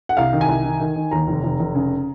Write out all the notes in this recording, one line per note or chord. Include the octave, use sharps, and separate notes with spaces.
F#5
C2 F5
D#3
G#5
C2
D#3
D#3
D#3
D#2 A#5
F1
F1
F1
C#3